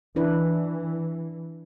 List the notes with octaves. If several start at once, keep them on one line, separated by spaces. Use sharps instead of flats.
E3 D4 E4 B4